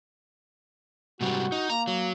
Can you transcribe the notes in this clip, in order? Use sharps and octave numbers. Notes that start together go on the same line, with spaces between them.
G#2 C3 G3 F#4
D#4
A#3 A#5
F#3